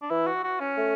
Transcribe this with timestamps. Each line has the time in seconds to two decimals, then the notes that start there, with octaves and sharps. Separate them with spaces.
0.02 D4
0.10 E3 E4
0.27 F#4
0.44 F#4
0.60 C#4
0.77 A3